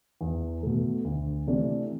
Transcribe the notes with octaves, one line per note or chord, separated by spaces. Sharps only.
E2
B2 A3
D2
C3 E3 A3 D4